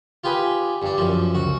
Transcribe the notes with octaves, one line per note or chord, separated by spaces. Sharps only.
F4 G4 G#4 B4
G2 D4
F#2 F3
C#2 F#4